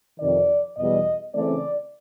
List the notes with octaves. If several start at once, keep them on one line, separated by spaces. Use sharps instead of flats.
F2 C3 D#3 D5
E2 B2 G3 D#5
C#3 E3 A3 C4 D5